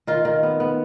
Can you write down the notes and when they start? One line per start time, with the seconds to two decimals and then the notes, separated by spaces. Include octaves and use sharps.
0.07 D#3 F4
0.25 D#3
0.43 B3
0.60 B3